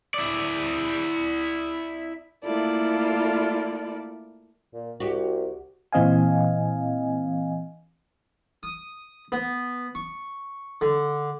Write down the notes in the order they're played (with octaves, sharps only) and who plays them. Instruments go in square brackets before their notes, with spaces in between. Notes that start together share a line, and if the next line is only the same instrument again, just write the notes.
[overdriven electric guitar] E4 D5
[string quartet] A3 A#3 E4 F4 A4 D5
[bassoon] A#2
[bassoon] C2 [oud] F#4 G4
[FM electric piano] A#2 E3 C4 D#5 F5 G#5
[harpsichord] D#6
B3
C#6
D3